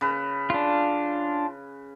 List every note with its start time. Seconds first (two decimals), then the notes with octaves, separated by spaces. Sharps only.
0.01 C#3 B4
0.50 D4 F4